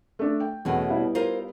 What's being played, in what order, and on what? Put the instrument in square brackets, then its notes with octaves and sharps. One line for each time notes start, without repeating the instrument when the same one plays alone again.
[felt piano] A3 D4
G5
[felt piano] E2 A3 [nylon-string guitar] B2 C#4
[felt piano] G3 B3 E4
[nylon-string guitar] F4 A#4 C5